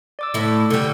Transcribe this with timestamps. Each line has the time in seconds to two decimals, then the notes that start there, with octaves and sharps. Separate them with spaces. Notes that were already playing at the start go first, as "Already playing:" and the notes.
0.19 D5 D6 E6
0.34 A2 E4
0.70 D3 G3